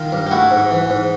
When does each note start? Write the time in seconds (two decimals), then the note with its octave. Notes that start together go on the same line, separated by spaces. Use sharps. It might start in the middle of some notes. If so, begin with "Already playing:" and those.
Already playing: D#3 F4
0.12 G2
0.27 G4
0.31 A3 E4 F#4
0.51 G#2
0.71 E3
0.90 G#2